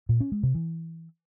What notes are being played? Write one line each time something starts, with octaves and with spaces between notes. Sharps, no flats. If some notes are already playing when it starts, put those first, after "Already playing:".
A#2
C#4
G#3
C3
E3